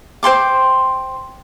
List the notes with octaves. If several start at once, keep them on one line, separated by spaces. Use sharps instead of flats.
C5 G5 C6 D6